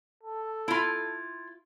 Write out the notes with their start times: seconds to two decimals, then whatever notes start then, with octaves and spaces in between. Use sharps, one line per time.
0.23 A4
0.68 E4 F4